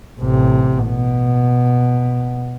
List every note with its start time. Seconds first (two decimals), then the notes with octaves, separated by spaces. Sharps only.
0.20 A1 C3
0.87 B2